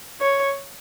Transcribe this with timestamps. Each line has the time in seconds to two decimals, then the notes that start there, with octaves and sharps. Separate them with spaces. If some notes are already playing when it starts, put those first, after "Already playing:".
0.21 C#5